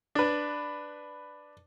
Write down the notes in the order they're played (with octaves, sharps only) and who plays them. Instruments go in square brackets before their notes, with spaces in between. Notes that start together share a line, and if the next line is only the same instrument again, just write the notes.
[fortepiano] D4 B4